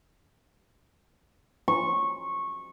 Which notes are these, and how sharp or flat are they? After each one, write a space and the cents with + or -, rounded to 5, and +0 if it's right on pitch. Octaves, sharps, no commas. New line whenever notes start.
C#6 -15